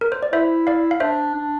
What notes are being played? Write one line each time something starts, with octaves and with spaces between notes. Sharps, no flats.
A#4
C5
D5
E4 C5 E5
D5 F5
F5
D4 C5 E5
D4